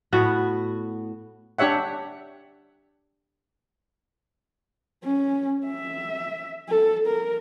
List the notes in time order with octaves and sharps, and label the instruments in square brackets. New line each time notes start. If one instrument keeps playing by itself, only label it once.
[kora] A2 B3 F#4
[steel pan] D4 G4 C#5 E5 F#5
[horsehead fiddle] C#4
E5
A4
A#4